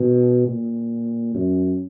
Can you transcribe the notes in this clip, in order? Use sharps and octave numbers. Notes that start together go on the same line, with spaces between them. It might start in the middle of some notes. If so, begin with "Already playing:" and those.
Already playing: B2
A#2
F#2